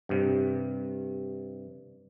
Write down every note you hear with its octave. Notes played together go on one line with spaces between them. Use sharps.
G2 C3